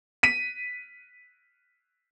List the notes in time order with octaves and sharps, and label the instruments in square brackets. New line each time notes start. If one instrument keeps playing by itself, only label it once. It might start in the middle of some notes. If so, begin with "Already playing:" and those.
[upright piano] B6 D#7